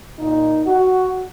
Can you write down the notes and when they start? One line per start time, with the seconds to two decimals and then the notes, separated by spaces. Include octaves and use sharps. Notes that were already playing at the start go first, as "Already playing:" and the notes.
0.20 A#2 D#4
0.66 F#4